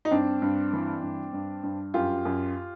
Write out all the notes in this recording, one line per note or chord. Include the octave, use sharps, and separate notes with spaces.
D#4
G2 C4 D4
G2
E3
G2
G2
G2
F#2 F4 G4
F#2